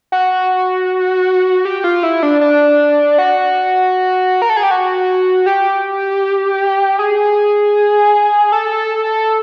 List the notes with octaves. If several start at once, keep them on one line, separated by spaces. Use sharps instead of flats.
F#4
G4
F4
E4
D4
D4
F#4
A#4
A4
G#4
G4
F#4
G4
G#4
A4